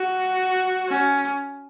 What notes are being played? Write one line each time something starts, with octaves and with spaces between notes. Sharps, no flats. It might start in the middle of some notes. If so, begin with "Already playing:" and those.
Already playing: F#4
C#4